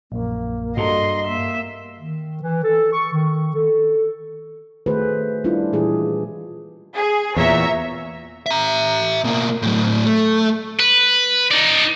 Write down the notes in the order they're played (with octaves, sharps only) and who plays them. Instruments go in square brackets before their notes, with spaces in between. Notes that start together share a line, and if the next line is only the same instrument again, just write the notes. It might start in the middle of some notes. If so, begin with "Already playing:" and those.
[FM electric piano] A#1 F#2 [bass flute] A#3
[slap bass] G2 [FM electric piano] F#4 A4 A#5 [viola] D#5 C6
[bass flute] A#3 [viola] E5
[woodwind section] D#3
E3
A4
C#6
D#3
A4
[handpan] D#3 A3 F#4 G#4 B4 C5
G3 C#4 D4 E4 F4
A#2 E3 G3 G#3 G#4
[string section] G#4
[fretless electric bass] E2 A#2 [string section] C#5 E5 A#5
[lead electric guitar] E5 A#5
B2 A#3
A2 F#3
A3
[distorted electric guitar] B4
D#4 D5